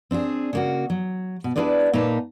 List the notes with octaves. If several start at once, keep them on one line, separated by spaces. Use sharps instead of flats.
C4 D4 F4 G#4
C#3 A#3 F#4
F#3
B2
D4 E4 F4 G#4 B4 D5
A#2 A#3 D#4 B4 A5